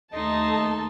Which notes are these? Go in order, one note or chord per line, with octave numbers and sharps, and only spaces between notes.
D#2 A3 D#4 D#5 A5 C6